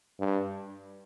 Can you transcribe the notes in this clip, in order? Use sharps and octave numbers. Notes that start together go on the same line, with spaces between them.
G2